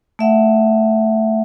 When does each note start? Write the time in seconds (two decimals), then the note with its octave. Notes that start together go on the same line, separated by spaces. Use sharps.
0.19 A3 E5 F#5